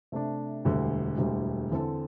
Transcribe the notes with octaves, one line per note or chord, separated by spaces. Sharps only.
C3 A3 D4
E1 D2 D3 G3
E1 D2 D3 G3
E2 D3 C4 A4